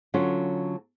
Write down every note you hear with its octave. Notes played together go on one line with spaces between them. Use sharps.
D3 F#3 C#4 F4